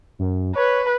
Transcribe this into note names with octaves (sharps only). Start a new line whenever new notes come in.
F#2
B4 C#5